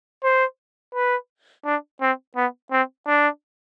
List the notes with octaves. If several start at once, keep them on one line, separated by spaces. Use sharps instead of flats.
C5
B4
D4
C4
B3
C4
D4